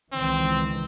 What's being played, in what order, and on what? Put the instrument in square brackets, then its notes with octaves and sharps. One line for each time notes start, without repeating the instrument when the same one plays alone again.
[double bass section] C#2 D#3 E3 [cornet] C4